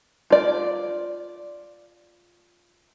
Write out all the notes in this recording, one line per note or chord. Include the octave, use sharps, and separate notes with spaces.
F4 D5